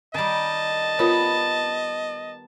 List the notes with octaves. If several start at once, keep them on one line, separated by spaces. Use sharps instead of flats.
D#3 G3 D#5 A5
B3 F4 A#4 C#5